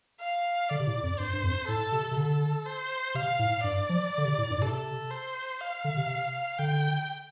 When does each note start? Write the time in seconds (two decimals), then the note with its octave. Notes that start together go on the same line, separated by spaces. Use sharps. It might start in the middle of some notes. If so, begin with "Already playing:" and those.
0.21 F5
0.69 D3 D5
0.79 C3
0.87 A2
1.03 F2
1.19 G2 C5
1.33 G2
1.44 F2
1.68 A2 A4
1.92 C3
2.11 C3
2.17 D3 A4
2.66 C5
3.15 C3 F5
3.39 A2
3.64 G2 D5
3.89 F3
4.18 D3
4.25 C3
4.38 A2
4.50 G2
4.57 A2
4.62 C3 A4
5.11 C5
5.60 F5
5.84 D3
5.97 C3
6.58 D3 G5